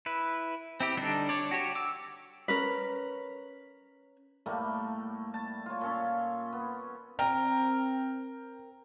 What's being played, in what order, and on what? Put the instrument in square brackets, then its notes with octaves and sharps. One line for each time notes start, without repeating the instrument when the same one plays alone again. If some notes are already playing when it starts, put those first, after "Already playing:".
[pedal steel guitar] E4 B4
C4 E4 G4
D3 G3 D4 D#4 A4
D4 C#5 D5
F#4 G4 C#5
D6 E6
[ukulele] C#4 A#4 B4
[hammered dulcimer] A2 G3 A3 A#3
A5
F4 C#5
A#2 C#4 A4
B3
[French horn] C4 [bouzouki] A#4 [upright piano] G5